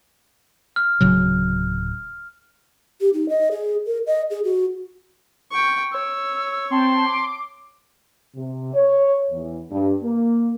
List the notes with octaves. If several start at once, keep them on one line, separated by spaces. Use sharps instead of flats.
F6
D1 C#3 F#3
G4
D#4
D#5
G#4
A#4
D#5
G#4
F#4
G5 C#6
C#5 E6
C4 G5 A5 C6
D6
C3
C#5
E2
G2
A#3